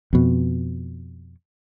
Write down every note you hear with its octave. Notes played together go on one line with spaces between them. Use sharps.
F2 B2